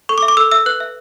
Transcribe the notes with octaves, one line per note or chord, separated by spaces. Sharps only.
A4 C#6
D6
E5
D6
A4 E6
E5 E6
B4 F#6
E5